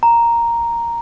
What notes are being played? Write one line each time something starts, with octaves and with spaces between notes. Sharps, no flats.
A#5